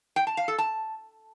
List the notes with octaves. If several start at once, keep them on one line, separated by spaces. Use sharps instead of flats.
G5
A5
F5
A4
A5